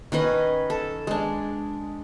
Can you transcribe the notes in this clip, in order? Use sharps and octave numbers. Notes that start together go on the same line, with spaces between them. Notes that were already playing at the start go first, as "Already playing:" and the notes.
D#3 C#4 B4 D#5
A4
G#3 D4